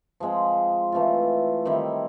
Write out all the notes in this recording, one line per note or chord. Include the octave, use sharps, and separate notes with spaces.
F3 G#3 C4
E3 A3 C4 F4
D#3 G3 C4 E4